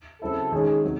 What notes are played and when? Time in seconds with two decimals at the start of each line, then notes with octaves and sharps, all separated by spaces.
0.22 C#3 F#3 C4 E4 A4
0.52 D#3 G#3 C#4 G#4
0.83 C3 F#3